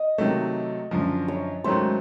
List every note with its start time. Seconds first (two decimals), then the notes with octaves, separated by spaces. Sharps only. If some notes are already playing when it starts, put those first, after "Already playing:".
Already playing: D#5
0.18 C3 D#3 F#3 A3
0.91 F#2 D3 F3
1.28 C#5
1.64 G#2 D#3 F#3 A3 C#4 C5